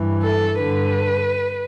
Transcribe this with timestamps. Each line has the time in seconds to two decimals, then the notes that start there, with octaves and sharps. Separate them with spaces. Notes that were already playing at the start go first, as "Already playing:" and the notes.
Already playing: G2 E3
0.22 A4
0.58 G2 D3 B4